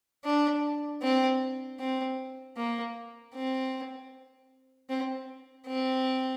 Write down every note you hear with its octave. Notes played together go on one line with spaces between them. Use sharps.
D4
C4
C4
A#3
C4
C4
C4